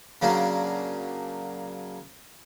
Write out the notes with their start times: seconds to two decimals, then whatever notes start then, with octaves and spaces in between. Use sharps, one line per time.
0.22 C#3 F#3 A#3 D4